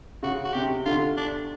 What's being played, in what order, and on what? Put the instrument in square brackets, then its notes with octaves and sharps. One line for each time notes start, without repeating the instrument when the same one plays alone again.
[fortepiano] C#3 [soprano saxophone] F#4
[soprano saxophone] F#4
[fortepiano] C3 [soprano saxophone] G4
[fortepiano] D3 [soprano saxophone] F4
[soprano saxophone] D4